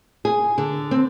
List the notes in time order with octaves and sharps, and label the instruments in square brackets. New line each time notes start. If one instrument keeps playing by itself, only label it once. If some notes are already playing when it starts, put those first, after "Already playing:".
[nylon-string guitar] G#4
D3
C4